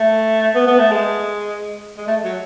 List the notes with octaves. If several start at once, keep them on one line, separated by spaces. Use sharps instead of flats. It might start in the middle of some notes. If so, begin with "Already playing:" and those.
Already playing: A3
B3
B3
A3
G#3
G#3
A3
F#3